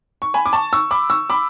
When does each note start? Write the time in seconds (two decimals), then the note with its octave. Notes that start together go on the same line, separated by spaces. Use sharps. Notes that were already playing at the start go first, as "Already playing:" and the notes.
0.22 C#6
0.34 G#5 B5
0.46 D6
0.53 A5 C#6
0.73 C#6 E6
0.91 B5 D6
1.10 C#6 E6
1.30 B5 D6